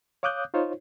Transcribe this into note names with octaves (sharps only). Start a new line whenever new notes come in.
C#5 F5 D6 D#6 F#6 G6
D#4 F4 C5 C#5